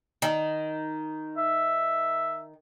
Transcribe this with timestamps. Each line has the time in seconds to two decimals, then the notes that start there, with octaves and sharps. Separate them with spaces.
0.22 D#3
1.37 E5